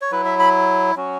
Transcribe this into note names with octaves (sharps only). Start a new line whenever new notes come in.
C#5
F#3 E4 B4
E5
B5
F#3 C#4 F#4